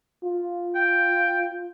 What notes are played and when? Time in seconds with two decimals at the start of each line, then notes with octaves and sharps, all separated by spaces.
0.24 F4
0.75 G5